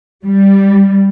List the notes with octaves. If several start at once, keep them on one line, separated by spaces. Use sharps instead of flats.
G3